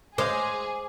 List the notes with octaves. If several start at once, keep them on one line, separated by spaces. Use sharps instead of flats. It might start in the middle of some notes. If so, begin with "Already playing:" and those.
G#3 G#4 C5 F5 D6